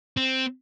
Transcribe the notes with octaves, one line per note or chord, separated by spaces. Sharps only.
C4